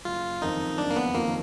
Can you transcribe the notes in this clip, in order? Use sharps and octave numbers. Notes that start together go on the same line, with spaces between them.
F#1 F4
F2 D#3 D#4
F#1 D4
A#3
B3
F2 D#3 A#3